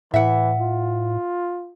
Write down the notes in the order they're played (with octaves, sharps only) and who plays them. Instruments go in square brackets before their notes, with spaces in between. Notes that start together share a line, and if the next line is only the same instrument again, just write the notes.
[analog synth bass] A2 [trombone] E3 [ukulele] E5 F#5
[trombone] F4